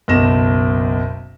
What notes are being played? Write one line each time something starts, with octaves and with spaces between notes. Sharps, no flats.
F#1 B1 A#6 E7